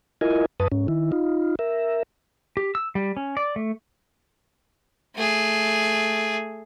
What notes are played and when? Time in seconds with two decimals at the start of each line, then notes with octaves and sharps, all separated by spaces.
0.21 E4 F4 A#4 D#5 G#5
0.60 F#2 B4 A5 D#6
0.72 G#2 C#4
0.88 D#3 E4
1.12 D#4 F4
1.59 A#4 E5
2.57 G4
2.75 E6
2.95 G3
3.17 C#4
3.37 D5
3.56 A3
5.16 A3 G#4